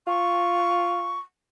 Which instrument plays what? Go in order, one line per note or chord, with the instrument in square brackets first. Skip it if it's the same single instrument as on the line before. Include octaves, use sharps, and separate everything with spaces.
[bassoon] F4 [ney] C#6